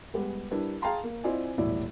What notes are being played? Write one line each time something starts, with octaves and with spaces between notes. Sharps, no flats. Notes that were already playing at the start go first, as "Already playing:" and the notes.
G3 G#3 B3 G4
G3 D4 E4 G4 A#4 B4
G#4 F5 G5 A5 A#5 C6
A#3
C4 E4 F4 D5 D#5 G#5
D#1 B1 A2 E3 E4 D5